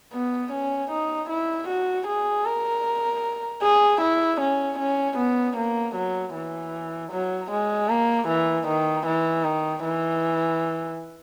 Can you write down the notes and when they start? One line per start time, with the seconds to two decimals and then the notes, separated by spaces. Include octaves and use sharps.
0.13 B3
0.52 C#4
0.91 D#4
1.29 E4
1.68 F#4
2.07 G#4
2.46 A#4
3.62 G#4
4.01 E4
4.41 C#4
4.79 C#4
5.18 B3
5.57 A#3
5.95 F#3
6.34 E3
7.12 F#3
7.51 G#3
7.89 A#3
8.28 E3
8.68 D#3
9.06 E3
9.44 D#3
9.83 E3